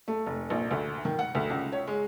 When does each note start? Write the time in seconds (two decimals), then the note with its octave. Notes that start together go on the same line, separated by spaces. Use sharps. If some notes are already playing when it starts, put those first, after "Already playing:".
0.08 A3
0.26 F1
0.50 A#1
0.71 D2
1.05 D#3
1.19 F#5
1.35 D2
1.50 C#2
1.72 C#5
1.87 G#3